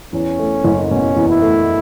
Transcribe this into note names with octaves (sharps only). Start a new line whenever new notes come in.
E2 C#4
A3
F#1
B2 C#4
E2
E4
A3